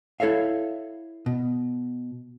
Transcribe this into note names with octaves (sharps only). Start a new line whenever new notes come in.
E4 A4 C#5 E5 F5
B2